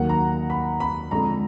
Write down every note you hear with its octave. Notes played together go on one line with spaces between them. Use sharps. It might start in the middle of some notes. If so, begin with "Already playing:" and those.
Already playing: D#2 D#3 F#3 A#3 F#5
A#5
B5
B5
F2 D3 G#3 A#5